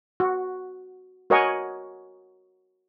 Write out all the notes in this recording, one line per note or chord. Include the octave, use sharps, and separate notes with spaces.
F#4
F#4 A#4 C#5 D#5 F#5 G#5